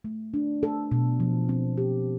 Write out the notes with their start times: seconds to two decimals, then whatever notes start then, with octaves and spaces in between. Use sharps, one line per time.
0.04 A3
0.34 D4
0.63 A4
0.92 B2
1.20 F3
1.49 C4
1.78 G4